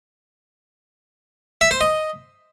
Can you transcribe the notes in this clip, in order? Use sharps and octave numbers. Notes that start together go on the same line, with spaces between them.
E5
C5
D#5